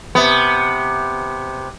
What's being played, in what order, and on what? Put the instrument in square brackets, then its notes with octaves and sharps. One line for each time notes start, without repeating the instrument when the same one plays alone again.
[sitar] C3 B3